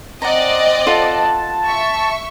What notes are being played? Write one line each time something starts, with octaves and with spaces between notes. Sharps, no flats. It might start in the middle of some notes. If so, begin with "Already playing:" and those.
C4 D5 D#5 F#5 A#5
F4 A4 F#5 A5
E5 C#6